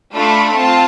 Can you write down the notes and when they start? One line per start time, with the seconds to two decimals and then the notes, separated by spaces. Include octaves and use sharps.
0.14 A3 D4 F4 A4 B5
0.56 C4 F4 A5